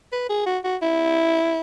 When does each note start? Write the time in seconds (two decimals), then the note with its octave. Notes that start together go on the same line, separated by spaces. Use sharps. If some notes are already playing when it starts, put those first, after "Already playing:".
0.12 B4
0.29 G#4
0.46 F#4
0.64 F#4
0.82 E4